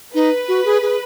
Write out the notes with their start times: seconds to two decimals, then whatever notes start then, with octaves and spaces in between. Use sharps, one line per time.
0.14 D#4 B4
0.48 F#4
0.65 G#4
0.82 G#4